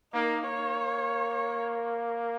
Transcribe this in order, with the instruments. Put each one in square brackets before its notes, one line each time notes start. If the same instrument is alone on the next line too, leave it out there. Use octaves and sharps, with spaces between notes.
[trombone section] A#3 [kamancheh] D#4
[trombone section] A#3 [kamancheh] C#5
[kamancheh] C#5